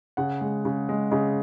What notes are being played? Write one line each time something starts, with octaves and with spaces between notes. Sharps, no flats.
C#3 F#5
G#3
C#3
G#3
C#3 D#5